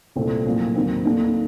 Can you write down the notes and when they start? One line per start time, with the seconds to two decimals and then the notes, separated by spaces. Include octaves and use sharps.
0.16 C2 A#2 A3 C4
0.46 A#1 A2 F#3 A#3
0.75 D#2 D#3 F#3 C4
1.05 D#2 D#3 A3 D4